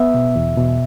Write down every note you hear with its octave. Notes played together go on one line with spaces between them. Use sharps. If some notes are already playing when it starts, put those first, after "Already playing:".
Already playing: B3 E5
B2
E2
B2